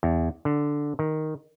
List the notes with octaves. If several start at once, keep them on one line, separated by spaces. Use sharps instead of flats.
E2
D3
D#3